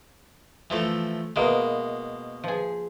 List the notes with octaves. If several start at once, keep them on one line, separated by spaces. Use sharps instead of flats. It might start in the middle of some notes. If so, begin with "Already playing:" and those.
E3 F3 A3
B2 G#3 A#3 E4
F3 G#4